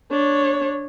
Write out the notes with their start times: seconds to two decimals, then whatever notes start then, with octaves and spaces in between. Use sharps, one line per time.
0.11 D4 C#5